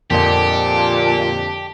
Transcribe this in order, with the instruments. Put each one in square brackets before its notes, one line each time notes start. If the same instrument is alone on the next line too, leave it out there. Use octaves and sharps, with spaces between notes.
[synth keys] F2 D3 D#5 [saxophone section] A#2 [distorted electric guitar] G4 [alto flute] A5